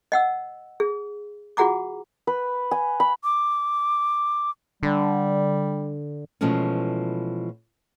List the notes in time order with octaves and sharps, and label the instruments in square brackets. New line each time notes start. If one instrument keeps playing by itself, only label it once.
[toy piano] D#5 F#5 E6
G#4
F4 F#4 G#4 F#5 A#5 D6
[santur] B4
G#5
B5
[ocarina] D6
[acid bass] D3 [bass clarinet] G3
[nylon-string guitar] B2 E3 F3 G#3 A3 C#4